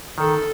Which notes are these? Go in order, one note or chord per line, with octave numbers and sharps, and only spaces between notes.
D#3 A4